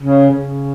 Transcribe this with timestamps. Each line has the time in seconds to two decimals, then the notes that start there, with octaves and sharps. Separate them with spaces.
0.03 C#3
0.31 C#3